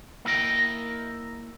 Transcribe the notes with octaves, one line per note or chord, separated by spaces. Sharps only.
A#3 E4 A#4 D#5 G5